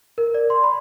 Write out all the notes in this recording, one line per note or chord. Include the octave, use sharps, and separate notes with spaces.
A#4
D5
C6
B5